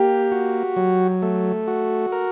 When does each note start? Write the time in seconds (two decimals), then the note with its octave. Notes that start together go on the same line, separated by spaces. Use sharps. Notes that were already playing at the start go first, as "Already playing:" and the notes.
Already playing: A#3 G4
0.32 F#4
0.76 F#3
1.22 A3
1.68 F#4
2.12 A#4